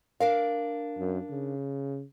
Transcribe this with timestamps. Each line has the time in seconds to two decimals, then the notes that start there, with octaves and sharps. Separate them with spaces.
0.20 D4 A#4 F5
0.98 F#2
1.30 C#3